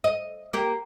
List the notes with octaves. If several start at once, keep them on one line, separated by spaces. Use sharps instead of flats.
D#5
A#3 G4